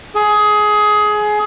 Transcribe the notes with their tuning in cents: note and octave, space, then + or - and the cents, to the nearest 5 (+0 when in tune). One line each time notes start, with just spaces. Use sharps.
G#4 +20